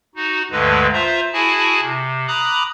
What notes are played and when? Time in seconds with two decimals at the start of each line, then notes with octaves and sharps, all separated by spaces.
0.16 D#4 F#4
0.51 D2 G2 D3 G#3 B4
0.93 F4 C5 E5 A#5
1.33 E4 F#4 G#4 G#5 A5
1.82 C3
2.27 A#5 B5 D6 D#6 F#6